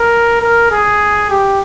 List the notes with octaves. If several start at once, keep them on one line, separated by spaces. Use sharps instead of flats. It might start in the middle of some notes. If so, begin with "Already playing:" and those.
Already playing: A#4
A#4
G#4
G4